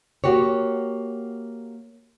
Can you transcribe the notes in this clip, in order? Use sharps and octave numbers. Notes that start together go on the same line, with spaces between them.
A#3 F#4 G4 C#5